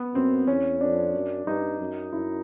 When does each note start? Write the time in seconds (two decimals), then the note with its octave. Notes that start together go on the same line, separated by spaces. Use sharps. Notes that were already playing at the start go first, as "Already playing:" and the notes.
Already playing: B3
0.14 F#2 C4
0.47 E2 C#4
0.81 F2 D4
1.14 F#2
1.46 G2 D#4
1.79 F#2
2.12 F#2 E4